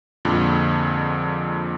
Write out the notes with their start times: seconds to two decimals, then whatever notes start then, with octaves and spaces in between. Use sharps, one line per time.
0.25 F2 A#2 D3 G#3